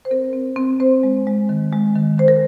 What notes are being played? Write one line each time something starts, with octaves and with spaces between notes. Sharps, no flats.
C5
C4 A#4
C4
C4
C4 C5
G#3
G#3
D#3
G#3
D#3
D#3 C5
A#4